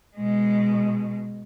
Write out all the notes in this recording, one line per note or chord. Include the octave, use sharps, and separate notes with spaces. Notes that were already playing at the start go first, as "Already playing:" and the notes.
B2 G#3